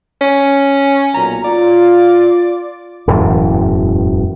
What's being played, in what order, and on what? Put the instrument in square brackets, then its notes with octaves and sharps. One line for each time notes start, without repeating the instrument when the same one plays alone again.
[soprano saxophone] C#4
[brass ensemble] B1 A#2 [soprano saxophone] A#5
[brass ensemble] F4 [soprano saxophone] D5
[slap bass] E1 F#2 A2 E3